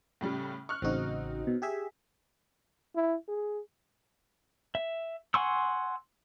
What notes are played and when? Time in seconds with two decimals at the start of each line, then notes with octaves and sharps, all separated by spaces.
0.21 A2 C#3 G3
0.69 C#6 F6 F#6
0.82 A1 C#3 C4 D#4 F#4
1.47 B2
1.62 G4 G#4 E5
2.96 E4
3.28 G#4
4.75 E5
5.34 F#5 G#5 C6 C#6 E6